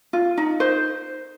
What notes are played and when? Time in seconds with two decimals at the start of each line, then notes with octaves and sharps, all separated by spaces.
0.13 F4
0.38 D#4
0.60 C5